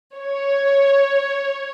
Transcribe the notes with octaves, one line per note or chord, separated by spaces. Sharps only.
C#5